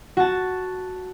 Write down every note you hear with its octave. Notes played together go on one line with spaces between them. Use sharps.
F#4 A5